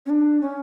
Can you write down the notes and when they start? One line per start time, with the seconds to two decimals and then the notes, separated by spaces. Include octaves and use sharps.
0.06 C#4
0.10 D4
0.41 C#4